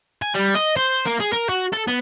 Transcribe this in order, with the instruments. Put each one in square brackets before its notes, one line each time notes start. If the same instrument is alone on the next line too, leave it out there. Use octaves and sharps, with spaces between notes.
[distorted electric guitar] G#5
G3
D#5
C5
A#3
G#4
A#4
F#4
A4
B3